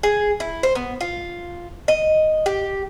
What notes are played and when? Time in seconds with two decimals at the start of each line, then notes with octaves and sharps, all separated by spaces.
0.03 G#4
0.40 E4
0.63 C5
0.75 B3
1.01 F4
1.88 D#5
2.46 G4